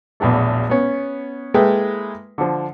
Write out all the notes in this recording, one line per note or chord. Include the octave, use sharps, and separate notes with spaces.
A#1 E2 B2 F#3 A3
B3 C#4
G#3 A#3 E4 A4 B4 G5
D3 F3